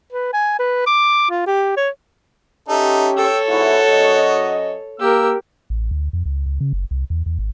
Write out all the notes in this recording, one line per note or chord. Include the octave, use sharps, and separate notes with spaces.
B4
G#5
B4
D6
F4
G4
C#5
C#4 D#4 G4 A4 E5
A4 C#5 G5 E6
E2 G#2 E4 F#4
F#2 D#5
A#3 G4 A#4 E6
A1
D2
F2
C#2
C#2
C#3
F#1
C2
E2
E2
G#1